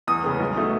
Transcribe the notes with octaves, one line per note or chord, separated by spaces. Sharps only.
E2 D#6
C#3 G#3 B3
B1
B2 A3 D#4